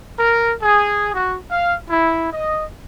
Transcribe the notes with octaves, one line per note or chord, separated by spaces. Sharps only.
A#4
G#4
F#4
F5
E4
D#5